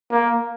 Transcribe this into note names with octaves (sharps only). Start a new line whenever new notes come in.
A#3